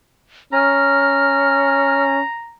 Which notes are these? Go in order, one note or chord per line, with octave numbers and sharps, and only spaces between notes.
C#4 A#5 F6